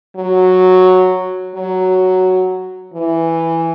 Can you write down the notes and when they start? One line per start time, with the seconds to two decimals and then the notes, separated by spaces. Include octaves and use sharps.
0.16 F#3
1.55 F#3
2.94 E3